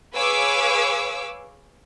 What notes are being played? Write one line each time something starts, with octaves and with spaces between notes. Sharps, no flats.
G#4 B4 C#5 F5 D6 E6